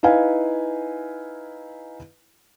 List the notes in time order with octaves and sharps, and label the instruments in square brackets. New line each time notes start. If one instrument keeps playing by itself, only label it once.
[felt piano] D#4 E4 B4 F5 G#5